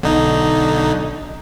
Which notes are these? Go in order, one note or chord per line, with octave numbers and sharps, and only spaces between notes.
B1 D3 D#4